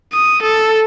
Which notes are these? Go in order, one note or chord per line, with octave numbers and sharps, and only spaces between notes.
D#6
A4